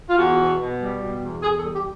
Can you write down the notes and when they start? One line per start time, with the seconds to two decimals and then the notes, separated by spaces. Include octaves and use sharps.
0.09 F4
0.17 E2 F#4
0.38 B2
0.59 B2
0.80 G3
1.00 B2
1.21 E2
1.42 E2 G#4
1.57 A4
1.63 G3
1.73 G4